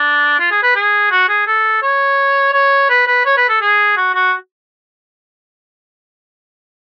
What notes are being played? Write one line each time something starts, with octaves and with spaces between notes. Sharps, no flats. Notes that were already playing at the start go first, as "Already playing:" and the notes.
Already playing: D4
F4
G#4
B4
G#4
F#4
G#4
A4
C#5
C#5
B4
B4
C#5
B4
A4
G#4
F#4
F#4